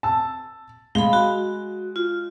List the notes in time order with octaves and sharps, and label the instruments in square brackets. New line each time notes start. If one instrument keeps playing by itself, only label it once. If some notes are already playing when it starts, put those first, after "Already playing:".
[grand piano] A5 E6
[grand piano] G#3 G7 [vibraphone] F5 B5
[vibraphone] F#4
F4